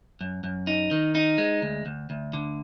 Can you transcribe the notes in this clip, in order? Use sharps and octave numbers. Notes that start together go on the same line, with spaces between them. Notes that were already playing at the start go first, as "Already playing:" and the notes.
F#2
F#2
D#4
D#3
D#4
G#3
D2
D2
D2
D3